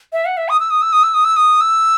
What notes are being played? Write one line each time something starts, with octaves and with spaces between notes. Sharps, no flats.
E5
F#5
E5
D#6
E6
D#6
E6
D#6
E6
D#6
E6
D#6
E6